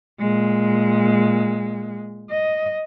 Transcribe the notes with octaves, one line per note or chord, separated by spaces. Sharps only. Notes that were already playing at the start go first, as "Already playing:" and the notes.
A#2 G#3
D#5